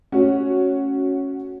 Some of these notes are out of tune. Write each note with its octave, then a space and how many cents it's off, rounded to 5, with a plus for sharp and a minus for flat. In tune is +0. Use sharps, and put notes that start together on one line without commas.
A3 +0 C#4 -5 F#4 +0